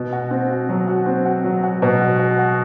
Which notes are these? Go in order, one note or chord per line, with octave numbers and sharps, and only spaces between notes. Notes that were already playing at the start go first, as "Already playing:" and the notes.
Already playing: B2
F#4
C4
F#4
F#3
F#4
C4
F#4
F#3
F#4
B2
F#4
F#4
F#4